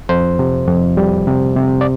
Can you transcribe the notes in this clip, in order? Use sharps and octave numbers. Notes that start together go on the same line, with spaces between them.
F2 C5
C3
F2
G3
C3
C3
D5